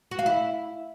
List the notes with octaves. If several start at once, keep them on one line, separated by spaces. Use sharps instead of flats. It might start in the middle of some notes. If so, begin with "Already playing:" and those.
F#4
F5
E4